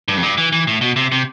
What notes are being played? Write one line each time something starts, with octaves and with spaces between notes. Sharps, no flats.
G2
F2
G2
E3
E3
A2
B2
C3
C3